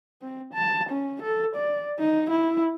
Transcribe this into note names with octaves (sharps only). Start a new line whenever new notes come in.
C4
A5
C#4
A4
D5
D#4
E4